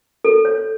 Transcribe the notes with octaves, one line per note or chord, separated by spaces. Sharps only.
A4
C#5